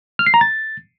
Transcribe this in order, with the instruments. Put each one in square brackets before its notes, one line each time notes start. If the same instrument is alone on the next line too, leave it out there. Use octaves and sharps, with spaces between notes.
[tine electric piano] F6
C7
A#5
A6